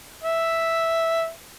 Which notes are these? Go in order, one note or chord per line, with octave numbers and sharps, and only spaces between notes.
E5